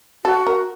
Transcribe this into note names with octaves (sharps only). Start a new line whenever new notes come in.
F#4 A4
A#4